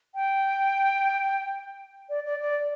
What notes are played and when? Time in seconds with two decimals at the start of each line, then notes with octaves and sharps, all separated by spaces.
0.15 G5
2.10 D5
2.25 D5
2.40 D5